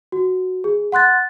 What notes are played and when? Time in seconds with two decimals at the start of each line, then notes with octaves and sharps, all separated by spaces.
0.12 F#4
0.64 G#4
0.92 F#5 C6 F#6 A6